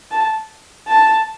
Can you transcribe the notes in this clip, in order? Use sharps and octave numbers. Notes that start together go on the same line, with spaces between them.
A5
A5